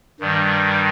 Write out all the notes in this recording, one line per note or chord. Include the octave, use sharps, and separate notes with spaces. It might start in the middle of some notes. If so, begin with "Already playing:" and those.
G2 D#3 G3